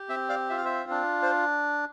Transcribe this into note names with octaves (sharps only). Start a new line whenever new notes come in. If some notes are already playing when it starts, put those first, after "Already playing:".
Already playing: G4
C4 E5 G5
D5 F5
F4 E5
F5
C5 E5
D4
C5